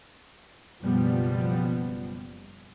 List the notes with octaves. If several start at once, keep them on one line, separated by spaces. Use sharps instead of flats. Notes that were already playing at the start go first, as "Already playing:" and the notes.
F#1 B2 F3 G3 B3